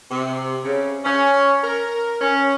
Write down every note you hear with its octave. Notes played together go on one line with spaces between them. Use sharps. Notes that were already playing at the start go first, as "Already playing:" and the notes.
C3
C#3
C#4
A#4
C#4